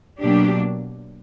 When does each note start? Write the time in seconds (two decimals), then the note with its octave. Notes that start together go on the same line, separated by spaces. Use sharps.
0.21 B2 F#3 A#3 D4 G4